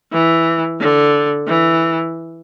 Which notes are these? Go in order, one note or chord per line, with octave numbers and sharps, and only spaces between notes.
E3
D3
E3